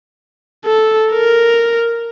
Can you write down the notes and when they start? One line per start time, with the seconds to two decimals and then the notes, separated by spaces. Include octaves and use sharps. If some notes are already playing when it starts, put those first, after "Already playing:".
0.66 A4
1.12 A#4